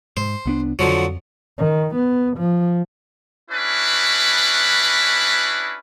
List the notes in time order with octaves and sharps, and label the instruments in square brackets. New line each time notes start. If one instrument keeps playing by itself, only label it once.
[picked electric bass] G#2 [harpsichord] C5
[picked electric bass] C2 B3 D4
[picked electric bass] F2 [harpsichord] D3 F3 F#3
[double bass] D#3
B3
F3
[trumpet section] C#4 D4 E4 F#4 B4